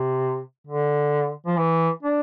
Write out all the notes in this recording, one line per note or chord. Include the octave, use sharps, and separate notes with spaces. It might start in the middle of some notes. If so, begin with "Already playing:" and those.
Already playing: C3
D3
F3
E3
D4